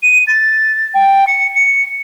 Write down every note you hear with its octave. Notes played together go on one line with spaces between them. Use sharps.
D#7
A6
G5
C#7
C#7